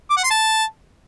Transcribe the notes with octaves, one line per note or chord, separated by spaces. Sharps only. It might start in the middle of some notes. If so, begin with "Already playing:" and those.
D6
F#5
C6
A5